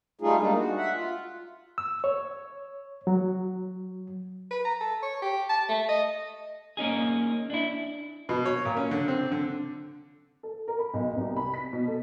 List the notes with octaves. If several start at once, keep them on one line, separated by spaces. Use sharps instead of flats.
G3 A3 D#4 F4 G#4
G3 G#3 A#3 D4 D#4
F#4
E5 F#5
F4
E6
C#5
F#3
B4
A#5
A4
C#5
G4
A5
A3
D#5
A#3 C#4 D#4 G#4
D4 E4
B2
C#5
A#2
C#4
D3
C4
D3
A4
A#4
B5
B1
C2
B5
B6
B2
A4